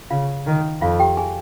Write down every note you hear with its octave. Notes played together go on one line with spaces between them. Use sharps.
C#3 F4 F5
D#3
F2 F4 F5
G4 G5
G#4 G#5